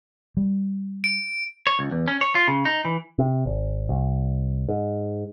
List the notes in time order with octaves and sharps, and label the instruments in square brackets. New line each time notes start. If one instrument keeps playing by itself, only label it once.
[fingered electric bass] G3
[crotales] D7
[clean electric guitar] C#5
C#2
E2
C#4
C#5
F4
C#3
D#4
E3
[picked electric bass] C3
G#1
C2
G#2